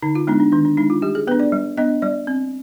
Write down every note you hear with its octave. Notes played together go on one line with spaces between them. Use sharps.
D3 D#4
F4
G#3 B3 D4 D#4
D4
D#3 D4
D4
G#3 D4 D#4
F4
G3 G4
G#4
B3 D4 B4
D5
G3
B3 D4 D#5
G3 D5
C4